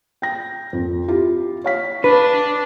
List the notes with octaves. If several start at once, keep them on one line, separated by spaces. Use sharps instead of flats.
G5 A#6
F2
E4 F4 G4
C#5 F5 B6
D4 B4